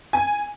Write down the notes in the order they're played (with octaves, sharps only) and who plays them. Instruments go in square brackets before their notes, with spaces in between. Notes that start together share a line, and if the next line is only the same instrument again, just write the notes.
[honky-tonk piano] G#5